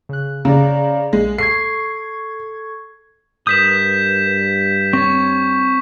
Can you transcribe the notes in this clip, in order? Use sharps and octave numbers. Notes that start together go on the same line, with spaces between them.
C#3 F#6
C#3 D5 A#5
A#1 G#3
A4 C#6 G#6 C7
G2 A#4 B4 D#6 G6 B6 E7
C4 C#5 C#6